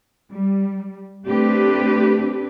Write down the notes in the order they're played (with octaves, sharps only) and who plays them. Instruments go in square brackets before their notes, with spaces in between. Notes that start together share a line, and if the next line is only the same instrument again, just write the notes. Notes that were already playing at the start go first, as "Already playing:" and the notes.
[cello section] G3
A3 C4 D4 G4 B4